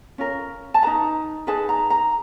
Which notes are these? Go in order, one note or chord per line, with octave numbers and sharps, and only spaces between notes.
C#4 F4 A#4
A5
D#4 G#4 B4 A#5
D#4 G#4 B4 A5
A#5
A#5